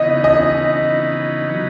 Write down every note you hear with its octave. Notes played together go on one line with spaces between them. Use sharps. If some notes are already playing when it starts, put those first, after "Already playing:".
Already playing: C#3 E3 B3 D#4 D#5
D#5
F#3 B3 D#4